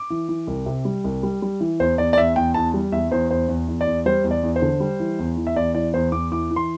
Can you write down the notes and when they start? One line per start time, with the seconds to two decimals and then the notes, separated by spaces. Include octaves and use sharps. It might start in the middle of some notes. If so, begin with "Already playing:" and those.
Already playing: D6
0.10 E3
0.29 E3
0.47 C2
0.66 C3
0.85 G3
1.04 C2
1.23 G3
1.42 G3
1.61 E3
1.80 E2 C5
1.98 E2 D5
2.13 D5
2.17 E2 E5
2.36 E2 G5
2.54 E2 A5
2.74 G3
2.92 E2 E5
3.11 E2 C5
3.30 E2 C5
3.48 E2
3.68 E2
3.81 D5
3.87 E2
4.06 G3 C5
4.24 E2
4.31 D5
4.43 E2
4.56 C5
4.62 D3
4.80 G3
5.00 E3
5.19 E2
5.37 E3
5.47 E5
5.56 E2 D5
5.75 E3 D5
5.94 E2 C5
6.12 E2 D6
6.31 E3 D6
6.51 E3
6.56 C6